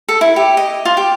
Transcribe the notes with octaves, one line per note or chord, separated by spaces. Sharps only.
A4
E4
G4
D#5
F4
G4